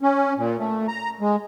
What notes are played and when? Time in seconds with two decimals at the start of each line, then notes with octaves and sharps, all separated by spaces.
0.01 C#4
0.37 A#2
0.59 A3
0.88 A#5
1.21 G#3